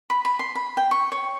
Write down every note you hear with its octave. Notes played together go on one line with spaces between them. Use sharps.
B5
B5
C6
B5
G5
C#6
C#5